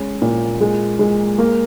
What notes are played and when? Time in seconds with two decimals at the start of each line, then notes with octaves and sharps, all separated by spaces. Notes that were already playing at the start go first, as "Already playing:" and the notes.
Already playing: G#3 C#4
0.22 A#2
0.60 G#3
0.99 G#3
1.38 A#3